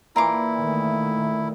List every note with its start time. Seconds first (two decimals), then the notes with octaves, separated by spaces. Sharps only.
0.16 A#2 E3 E4 A#4 C6 D6
0.61 D#3 A3